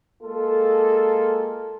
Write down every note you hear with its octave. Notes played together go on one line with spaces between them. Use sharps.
G#3 A#3 F4 A4